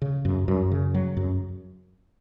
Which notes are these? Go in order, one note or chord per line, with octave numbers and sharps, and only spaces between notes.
C#3
F#2
F#2
C#3
F#3
F#2